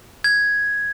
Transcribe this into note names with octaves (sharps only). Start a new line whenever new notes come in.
G#6